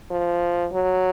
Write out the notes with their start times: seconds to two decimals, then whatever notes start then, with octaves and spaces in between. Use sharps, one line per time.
0.10 F3
0.73 F#3